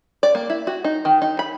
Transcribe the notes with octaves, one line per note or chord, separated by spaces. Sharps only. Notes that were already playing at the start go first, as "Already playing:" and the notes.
D5
A#3
E4
F#4
D#4
D#3
D#4
B5